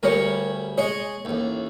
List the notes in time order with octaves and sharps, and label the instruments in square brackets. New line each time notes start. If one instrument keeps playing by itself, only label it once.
[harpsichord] D2 G3 C#4 [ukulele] A#4 C#5
[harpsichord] G#3 G#4 D#5 [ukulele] C#5
[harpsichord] A1 D#2